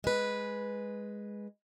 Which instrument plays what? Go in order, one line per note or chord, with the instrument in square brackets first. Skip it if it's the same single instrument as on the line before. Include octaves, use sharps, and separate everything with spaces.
[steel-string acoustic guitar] G#3 B4